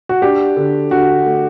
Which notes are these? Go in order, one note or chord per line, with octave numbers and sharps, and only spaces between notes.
F#4
D4 G4
D3
D3 F#4
A3